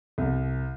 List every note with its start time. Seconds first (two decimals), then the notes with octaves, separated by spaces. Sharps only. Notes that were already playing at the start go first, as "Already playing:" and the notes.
0.18 C2